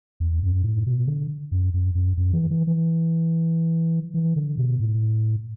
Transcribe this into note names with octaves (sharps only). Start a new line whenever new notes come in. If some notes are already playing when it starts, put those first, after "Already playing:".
E2
F#2
A2
B2
D3
F#2
F#2
F#2
F#2
E3
E3
E3
E3
D3
B2
A2